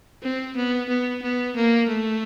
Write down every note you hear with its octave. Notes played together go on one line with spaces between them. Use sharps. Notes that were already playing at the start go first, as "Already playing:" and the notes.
C4
B3
B3
B3
A#3
A3